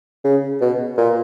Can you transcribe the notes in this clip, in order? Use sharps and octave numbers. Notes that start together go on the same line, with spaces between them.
C#3
B2
A#2